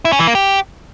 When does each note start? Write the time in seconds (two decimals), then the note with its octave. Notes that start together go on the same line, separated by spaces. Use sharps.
0.05 E4
0.12 C#4
0.20 E3
0.27 A#3
0.35 G4